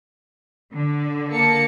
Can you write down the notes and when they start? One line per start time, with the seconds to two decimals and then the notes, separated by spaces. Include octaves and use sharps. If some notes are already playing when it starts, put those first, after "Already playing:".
0.73 D3
1.31 A#3 A5 C#7